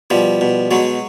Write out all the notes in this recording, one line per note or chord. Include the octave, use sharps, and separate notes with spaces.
B2 F3 G3
B2
B2 F#3 G#3